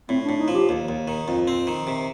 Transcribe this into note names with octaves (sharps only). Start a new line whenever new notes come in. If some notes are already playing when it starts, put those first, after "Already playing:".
A2 C4
D4
A2
D#4
F3
G4
D#2
D#2
D#3
F2
C4
D#3
C3